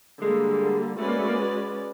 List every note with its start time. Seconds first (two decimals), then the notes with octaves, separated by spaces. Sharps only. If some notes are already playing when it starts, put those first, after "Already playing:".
0.22 D3 G3 G#3 A#3
0.98 G#3 A3 C#4 F#4 B4 D5
1.08 A#3
1.19 A3
1.28 A#3